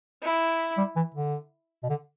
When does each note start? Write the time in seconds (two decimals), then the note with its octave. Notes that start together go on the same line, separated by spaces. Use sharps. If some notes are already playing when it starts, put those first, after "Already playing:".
0.22 E4
0.78 G3
0.96 E3
1.14 D3
1.83 B2
1.89 D3